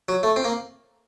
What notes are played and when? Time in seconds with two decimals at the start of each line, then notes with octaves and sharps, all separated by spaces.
0.09 F#3
0.23 A3
0.36 C4
0.44 A#3